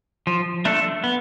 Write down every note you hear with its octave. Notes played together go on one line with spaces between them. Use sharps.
F3
A3 D4 A4
B3